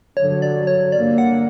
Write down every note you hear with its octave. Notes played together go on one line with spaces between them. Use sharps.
G2 D3 F#3 C#5
D5
C#5
G2 D3 A#3 D5
F#5